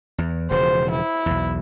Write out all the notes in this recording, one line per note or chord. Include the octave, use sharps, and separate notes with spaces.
E2
E1 C#3 F3 C5
E4
B1 E2